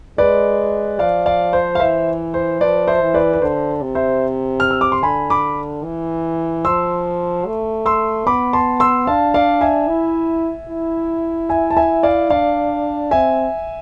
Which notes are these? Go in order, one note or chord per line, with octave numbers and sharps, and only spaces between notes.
G#3 B4 D5
F3 D5 F5
D5 F5
C5
F5
E3 C5 E5
C5
F3 B4 D5
C5 E5
E3
B4 D5
B4
D3 C5
C3
C5 E5
F6
E6
D6
C6
D3 G#5 B5
B5 D6
E3
F3 C6 E6
A3
C6 E6
B3 B5 D6
A5 C6
C6 E6
D4 F5 A5
D5 F5
E5 G#5
E4
E4
E5 G#5
A5
E5 G#5
D5 F5
D4 D5 F5
C4 E5 G#5